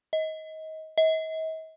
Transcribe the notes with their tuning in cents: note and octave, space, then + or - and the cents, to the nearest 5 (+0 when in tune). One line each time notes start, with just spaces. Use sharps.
D#5 +25
D#5 +45